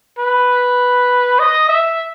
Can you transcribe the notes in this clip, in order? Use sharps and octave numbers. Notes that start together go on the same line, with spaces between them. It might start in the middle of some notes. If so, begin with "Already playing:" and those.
B4
D#5
E5